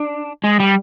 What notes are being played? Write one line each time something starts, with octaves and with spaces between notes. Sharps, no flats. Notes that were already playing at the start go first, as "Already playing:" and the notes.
Already playing: D4
G#3
G3